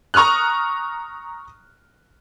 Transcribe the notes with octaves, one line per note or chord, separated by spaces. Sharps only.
A#5 C#6 D#6 F6 F#6